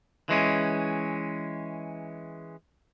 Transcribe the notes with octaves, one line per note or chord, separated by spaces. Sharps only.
E3 G#3 C#4